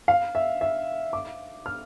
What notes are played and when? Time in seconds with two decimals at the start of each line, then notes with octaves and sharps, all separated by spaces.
0.08 F5
0.35 E5
0.61 E5
1.13 D6
1.66 F6